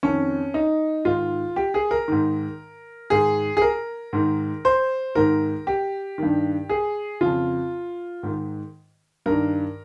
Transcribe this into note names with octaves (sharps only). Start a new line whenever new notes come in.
F2 D#3 C#4
D#4
G#2 D#3 F4
G4
G#4
A#4
G#2 D#3
G#2 D#3 G#4
G#4
A#4
G#2 D#3
C5
G#2 D#3 A#4
G4
G2 D#3
G#4
F2 C#3 F4
G#2 D#3
G2 D#3 A#4